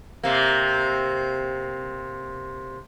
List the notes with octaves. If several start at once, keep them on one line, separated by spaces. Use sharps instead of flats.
C3 A#3